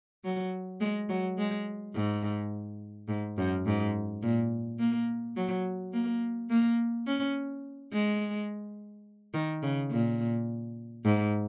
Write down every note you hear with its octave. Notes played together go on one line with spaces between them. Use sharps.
F#3
G#3
F#3
G#3
G#2
G#2
F#2
G#2
A#2
A#3
F#3
A#3
A#3
C#4
G#3
D#3
C#3
A#2
G#2